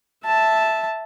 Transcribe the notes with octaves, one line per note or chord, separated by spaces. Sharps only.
E5 A5